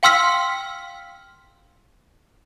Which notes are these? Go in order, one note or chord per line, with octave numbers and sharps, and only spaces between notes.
F5 G5 C6 E6 F6 B6